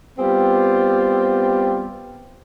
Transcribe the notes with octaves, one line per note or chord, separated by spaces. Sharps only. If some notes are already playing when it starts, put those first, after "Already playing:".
G3 B3 C4 F4 G4